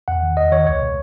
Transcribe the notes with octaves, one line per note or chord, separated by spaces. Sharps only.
E2 F#5
D#3
E2 D#5
D#3 C#5
C#2 C#5
B2